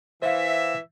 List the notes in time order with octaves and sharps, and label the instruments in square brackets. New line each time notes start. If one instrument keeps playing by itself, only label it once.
[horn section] E3 E5 [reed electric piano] C5 F5